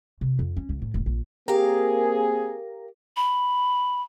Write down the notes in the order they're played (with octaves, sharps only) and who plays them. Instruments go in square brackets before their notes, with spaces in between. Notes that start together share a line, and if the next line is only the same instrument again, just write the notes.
[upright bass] C3
F2
C#4
C#2
A2
D1
A#1
[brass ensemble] A#3 C4 G#4 [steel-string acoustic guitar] G4 F5 [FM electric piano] A#4
[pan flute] B5